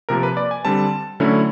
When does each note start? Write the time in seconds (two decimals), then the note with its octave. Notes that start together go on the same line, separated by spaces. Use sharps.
0.09 C3 F3 A#3 A#4
0.23 B4
0.37 D5
0.51 G#5
0.65 D3 G3 C4 A5
1.20 D3 F#3 A3 C#4 E4